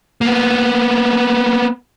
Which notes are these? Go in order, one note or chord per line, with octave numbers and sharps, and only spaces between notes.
A#3 B3